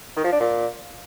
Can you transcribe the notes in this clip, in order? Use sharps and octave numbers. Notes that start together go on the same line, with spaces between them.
D#3
F3
D4
A#2